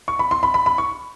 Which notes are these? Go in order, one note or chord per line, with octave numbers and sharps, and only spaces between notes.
C#6
B5
C6
B5
B5
B5
C#6